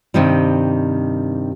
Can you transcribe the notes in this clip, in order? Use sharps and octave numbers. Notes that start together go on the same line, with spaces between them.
G2 C3 D#3 G3